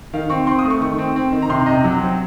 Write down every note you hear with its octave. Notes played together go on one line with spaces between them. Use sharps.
D#3 F5
C4 C#6
C4 C6
D#6
A3
C#6
D#3 C#6
C4
C4
D#3
A#5
C3 C6
C3 D#5
F#3
C4